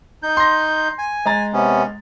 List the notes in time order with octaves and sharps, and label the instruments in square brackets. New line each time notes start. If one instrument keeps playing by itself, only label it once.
[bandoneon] D#4 G6
[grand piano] C6 A#6
[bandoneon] G#5
[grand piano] G#3 A#5 A6
[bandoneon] C3 B3 C#4